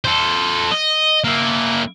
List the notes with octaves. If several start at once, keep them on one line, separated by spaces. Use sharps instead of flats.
A4 C5
D#5
A#3 E4